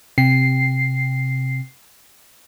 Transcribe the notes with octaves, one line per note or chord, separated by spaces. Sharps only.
C3 C7